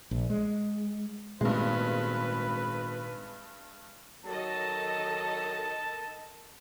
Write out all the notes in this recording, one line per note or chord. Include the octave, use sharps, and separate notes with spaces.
A#1
G#3
G#1 G2 A#2 G#3 A3 B3 B4
D#3 F#3 A4 D#5 A5